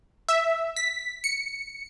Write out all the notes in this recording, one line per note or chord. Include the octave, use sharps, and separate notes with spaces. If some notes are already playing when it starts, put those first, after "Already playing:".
E5
B6
C#7